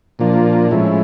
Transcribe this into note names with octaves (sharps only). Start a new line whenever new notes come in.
A#2 F3 A#3 D4 F4
A2 F3 G#3 C#4 E4